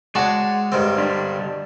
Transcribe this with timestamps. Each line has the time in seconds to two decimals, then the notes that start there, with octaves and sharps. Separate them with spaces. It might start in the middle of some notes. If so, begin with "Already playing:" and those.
0.15 G#3 F#4 C#5 D5 A5 C#6
0.72 G2 D#3 C4
0.98 D3 G3 D4